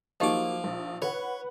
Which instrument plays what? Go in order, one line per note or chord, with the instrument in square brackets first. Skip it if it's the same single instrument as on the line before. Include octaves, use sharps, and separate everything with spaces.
[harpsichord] F3 D6 [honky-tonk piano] F#3 A#3 [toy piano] D#4 G4 D#5
[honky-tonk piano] A#1
[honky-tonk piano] B4 F#5 [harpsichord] C#5